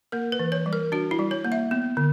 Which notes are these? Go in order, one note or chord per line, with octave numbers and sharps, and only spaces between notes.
A#3 A#4
B4
E3
C#5
G3
A#4
D4 F#4
E4
G3
C#5
A#3
E5
B3
D3